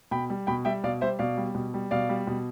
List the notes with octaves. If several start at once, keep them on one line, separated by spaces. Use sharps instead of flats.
B2 G5 B5
G3
B2 G5 B5
G3 E5 G5
B2 D5 F5
G3 C5 E5
B2 D5 F5
G3
B2
G3
B2 D5 F5
G3
B2